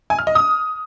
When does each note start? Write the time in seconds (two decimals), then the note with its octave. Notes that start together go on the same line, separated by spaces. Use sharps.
0.10 G#5
0.19 F6
0.27 D#5
0.35 D#6